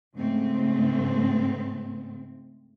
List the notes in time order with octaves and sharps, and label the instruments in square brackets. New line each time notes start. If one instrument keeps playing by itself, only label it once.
[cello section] G#2 C#3 A3 C4